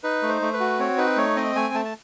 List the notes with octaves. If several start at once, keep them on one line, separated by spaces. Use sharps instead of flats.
D#4 B4
A3
C5
A3
B4
F#4
C4 C#5
D#4 B4
A3 C#5
C4 D#5
A3 G#5
A3 A5
A5